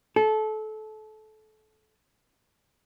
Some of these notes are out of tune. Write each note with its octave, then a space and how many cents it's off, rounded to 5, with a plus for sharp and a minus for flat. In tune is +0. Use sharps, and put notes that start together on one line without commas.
A4 -25